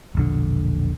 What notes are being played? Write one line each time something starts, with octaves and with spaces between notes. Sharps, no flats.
E1 A#1 D3